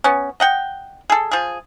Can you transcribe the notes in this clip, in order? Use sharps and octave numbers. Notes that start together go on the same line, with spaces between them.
B3 C#4
D#5 F#5 G5
G#4 A4
F3 G#4